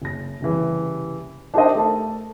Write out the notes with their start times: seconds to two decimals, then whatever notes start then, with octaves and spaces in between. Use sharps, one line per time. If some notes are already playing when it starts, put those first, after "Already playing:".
0.02 F#1 A#6
0.41 F#1 C2 C#3 E3 G3
1.54 D4 D#4 G4 A#4 C5 D#5
1.75 A3 A#4 A5